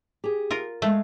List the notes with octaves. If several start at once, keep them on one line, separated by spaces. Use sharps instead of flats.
G4 G#4
F4 A#4
G#3 A3 F5